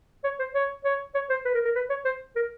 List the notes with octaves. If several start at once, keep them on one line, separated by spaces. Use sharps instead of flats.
C#5
C5
C#5
C#5
C#5
C5
B4
A#4
A#4
B4
C#5
C5
A#4